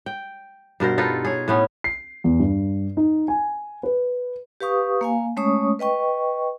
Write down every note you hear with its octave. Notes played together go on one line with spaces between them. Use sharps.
G5
G2 B2 A#4 C5
D#4 F4 A4 B4
G#4 C#5
A2 B3 C#4
C7
E2
G2
D#4
G#5
B4
G4 B4 F5 C#6 D#6
A#3 F5 G#5
G#3 A3 C#4 C#5 C#6 D#6
B4 D#5 G5 C#6